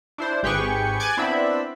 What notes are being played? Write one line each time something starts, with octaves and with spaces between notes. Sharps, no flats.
D4 E4 C5
G#1 G4 G#4 B4 G5 C#6
G#5 D6 F#6 G#6 A6
B3 C4 D4 E4 E5 B5